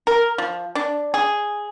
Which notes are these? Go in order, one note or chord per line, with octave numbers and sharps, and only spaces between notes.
A#4
F3
D4
G#4